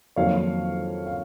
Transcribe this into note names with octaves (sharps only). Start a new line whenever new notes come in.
F2 D#3 F#3 A#3 C#5 F5
F5